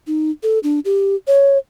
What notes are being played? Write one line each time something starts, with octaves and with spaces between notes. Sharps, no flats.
D#4
A4
D4
G4
C#5